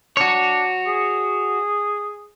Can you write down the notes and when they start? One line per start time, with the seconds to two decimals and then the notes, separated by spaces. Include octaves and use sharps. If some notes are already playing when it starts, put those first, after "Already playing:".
0.17 D4 F#4 C#5
0.87 G#4